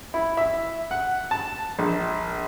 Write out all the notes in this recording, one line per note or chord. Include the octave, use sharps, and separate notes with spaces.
E4
E5
F#5
A5
A#1